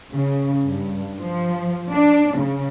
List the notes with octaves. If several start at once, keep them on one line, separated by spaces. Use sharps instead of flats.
C#3
G2
F3
D4
C#3